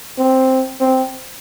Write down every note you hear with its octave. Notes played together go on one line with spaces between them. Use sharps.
C4
C4